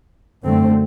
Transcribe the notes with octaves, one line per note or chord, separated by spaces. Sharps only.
F#2 D3 A3 C4